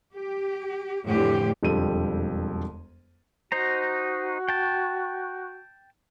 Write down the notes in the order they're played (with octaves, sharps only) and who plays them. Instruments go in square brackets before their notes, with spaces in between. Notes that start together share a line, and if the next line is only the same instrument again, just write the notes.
[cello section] G4
F2 A2 D3 E3 A3 G4
[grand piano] E1 F2 D3 G3 A4 D#7
[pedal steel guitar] D#4 C5 A#5 [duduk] F#4
[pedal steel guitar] G5 A5